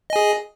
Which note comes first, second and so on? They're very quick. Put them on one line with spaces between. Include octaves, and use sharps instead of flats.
D#5 G#5 G#4